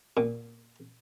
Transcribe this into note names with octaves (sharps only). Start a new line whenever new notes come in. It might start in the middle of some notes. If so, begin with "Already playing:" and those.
A#2